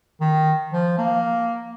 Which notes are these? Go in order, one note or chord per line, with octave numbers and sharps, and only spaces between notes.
D#3
F3
A#3